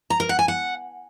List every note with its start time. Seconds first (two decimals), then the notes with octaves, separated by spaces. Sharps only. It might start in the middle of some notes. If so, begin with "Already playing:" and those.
0.10 A#5
0.20 A#4
0.29 F#5
0.39 G#5
0.48 F#5